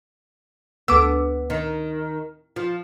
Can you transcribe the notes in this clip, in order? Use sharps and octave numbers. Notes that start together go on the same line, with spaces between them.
D2 B3 D6 E6
D#3
F3